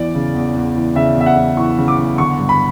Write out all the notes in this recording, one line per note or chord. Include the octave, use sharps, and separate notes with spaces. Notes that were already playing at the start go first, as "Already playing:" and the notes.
Already playing: E2 E3 D5
C#3
E2
E2
E3
C#3 E5
E2 E5
F#5
E2
E3 C#6
C#3
D6
E2
D3 C#6
G2
B5